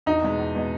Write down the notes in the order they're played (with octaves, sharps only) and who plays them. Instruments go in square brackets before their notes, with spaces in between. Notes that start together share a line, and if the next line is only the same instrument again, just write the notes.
[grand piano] E2 [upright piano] D#4
[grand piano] B2 G#3 B3
E2
B2 G#3 B3